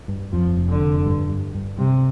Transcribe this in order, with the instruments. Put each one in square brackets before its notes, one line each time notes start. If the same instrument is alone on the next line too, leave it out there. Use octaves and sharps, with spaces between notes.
[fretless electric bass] G2
[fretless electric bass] F2 [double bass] F3
[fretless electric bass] F1
[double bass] D3
[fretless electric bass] F2
G2
G2
G2
[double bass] C3 [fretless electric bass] G3